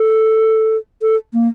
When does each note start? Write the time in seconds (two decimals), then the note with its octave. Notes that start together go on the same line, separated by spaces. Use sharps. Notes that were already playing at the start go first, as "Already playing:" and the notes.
Already playing: A4
1.02 A4
1.34 A#3